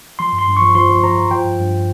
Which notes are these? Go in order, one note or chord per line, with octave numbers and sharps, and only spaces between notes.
F3 C6
G2
C6
G2
F3 C#6
F3 C6
F3
F3 A#5
F3
F3 G5
G2
G2